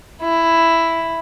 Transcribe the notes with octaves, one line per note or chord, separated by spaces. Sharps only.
E4